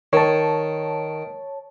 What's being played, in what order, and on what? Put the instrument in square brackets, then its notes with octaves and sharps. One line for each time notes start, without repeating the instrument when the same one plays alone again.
[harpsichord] D#3 [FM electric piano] C#5 A5